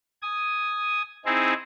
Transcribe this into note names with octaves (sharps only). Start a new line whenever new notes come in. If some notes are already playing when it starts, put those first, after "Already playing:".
G#5 D#6
C4 D#4 E4 G#4